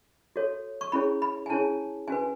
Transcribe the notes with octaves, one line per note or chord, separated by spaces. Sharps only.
F#4 A4 C#5
C#6
C#4 E4 G#4 C#5 B5
B5
G#5
C#4 E4 G#4 C#5 A5
C#4 F#4 B4 G#5